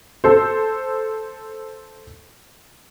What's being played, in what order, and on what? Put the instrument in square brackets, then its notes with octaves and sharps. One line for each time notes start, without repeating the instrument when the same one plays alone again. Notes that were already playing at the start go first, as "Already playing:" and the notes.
[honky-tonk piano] A4 C5